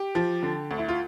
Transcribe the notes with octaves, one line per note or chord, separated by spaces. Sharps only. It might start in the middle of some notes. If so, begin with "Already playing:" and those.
Already playing: G4
F3
D3
D2
E4
F4